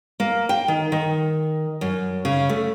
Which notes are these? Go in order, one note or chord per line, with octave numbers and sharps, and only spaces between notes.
A#3
G5
D#3
D#3
F#2
C#3
A3